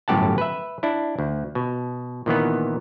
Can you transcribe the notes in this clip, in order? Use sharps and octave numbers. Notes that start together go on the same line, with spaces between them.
G1 F#2 A2 G4 F#5 A5
B4 E5
D4 E4
D2
B2
A#2 D#3 E3 B3